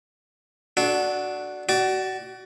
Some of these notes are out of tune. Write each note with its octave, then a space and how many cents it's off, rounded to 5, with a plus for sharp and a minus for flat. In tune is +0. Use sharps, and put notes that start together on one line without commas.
D4 +0 F#4 +0 A4 -30
F#4 +30 D5 +0